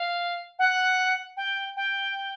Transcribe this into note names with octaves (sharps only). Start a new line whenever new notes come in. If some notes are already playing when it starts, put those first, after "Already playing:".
Already playing: F5
F#5
G5
G5